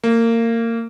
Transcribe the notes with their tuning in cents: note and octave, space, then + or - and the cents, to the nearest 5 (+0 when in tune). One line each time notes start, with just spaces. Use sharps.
A#3 -25